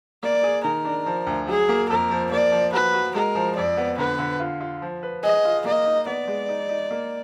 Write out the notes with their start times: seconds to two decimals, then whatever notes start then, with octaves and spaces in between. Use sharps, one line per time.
0.23 A#3 D5
0.43 G#4
0.64 D#3 A#4
0.85 D4
1.06 F3
1.27 D2
1.47 F#3 G#4
1.69 A#3
1.89 F2 A#4
2.11 F3
2.31 A#3 D5
2.52 F3
2.73 F#4 B4
2.94 F#4
3.15 G#3 A#4
3.35 F3
3.56 F2 D5
3.77 B3
3.98 D3 B4
4.19 D3
4.40 F4
4.61 F4
4.82 F3
5.03 B4
5.23 G#4 D#5
5.45 F4
5.65 A#3 D#5
5.86 D#4
6.06 B3 D5
6.28 G#3
6.49 D#4
6.69 D#4
6.91 A#3